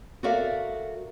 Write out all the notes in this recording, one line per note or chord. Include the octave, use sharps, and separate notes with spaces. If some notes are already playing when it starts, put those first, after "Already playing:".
F#4 A4 A#4 D5 E5 F5